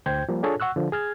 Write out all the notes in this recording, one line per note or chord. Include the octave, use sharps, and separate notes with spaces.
D2 C5 G5 G6 G#6
F3 G3 A#3
D4 F4 G#4 A4 C#5
F#5 C#6 E6 F#6
D3 F3
G#4 F6 G#6